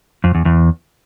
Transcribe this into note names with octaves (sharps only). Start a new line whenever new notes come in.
F2
E2
E2